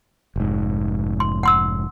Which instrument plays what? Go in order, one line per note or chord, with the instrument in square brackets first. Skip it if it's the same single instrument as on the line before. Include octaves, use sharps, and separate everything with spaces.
[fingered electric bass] F1 G#2
[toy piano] C6
F#5 C6 E6